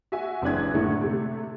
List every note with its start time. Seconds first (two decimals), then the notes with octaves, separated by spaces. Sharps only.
0.12 F#4 E5 G#5
0.42 F#1 E3 C4 D4 F#6 G#6
0.74 A2 D3 D#3 A3
1.01 C3 A3